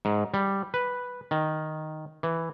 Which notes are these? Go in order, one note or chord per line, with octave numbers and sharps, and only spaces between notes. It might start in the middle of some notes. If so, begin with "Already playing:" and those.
G#2
G3
B4
D#3
E3